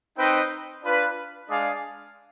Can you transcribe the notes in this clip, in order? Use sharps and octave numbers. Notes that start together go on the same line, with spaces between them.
C4 D#4 B4 D#5 G5
D4 F4 B4
G#3 D4 G#4 D5 F5